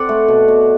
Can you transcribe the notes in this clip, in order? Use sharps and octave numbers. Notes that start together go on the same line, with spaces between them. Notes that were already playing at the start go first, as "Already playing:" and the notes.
Already playing: C4 A4 D5 F#5
A3
B2
B2